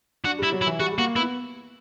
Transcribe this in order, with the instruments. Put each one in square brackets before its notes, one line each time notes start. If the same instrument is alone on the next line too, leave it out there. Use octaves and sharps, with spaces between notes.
[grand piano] D4 [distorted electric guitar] F#4
[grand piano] G3 [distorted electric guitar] E4
[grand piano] F#3
[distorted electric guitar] E4
[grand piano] E3
[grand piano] G3 [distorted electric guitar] F#4
[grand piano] G3
[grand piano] A#3 [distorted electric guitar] F#4
[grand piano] B3 [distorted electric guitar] E4